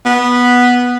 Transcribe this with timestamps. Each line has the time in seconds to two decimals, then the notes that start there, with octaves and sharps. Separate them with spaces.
0.05 B3